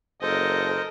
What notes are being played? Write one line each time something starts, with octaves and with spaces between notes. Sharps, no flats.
F#1 A4 A#4 C5 D#5